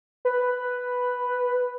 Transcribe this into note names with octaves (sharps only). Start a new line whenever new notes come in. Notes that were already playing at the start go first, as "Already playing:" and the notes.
B4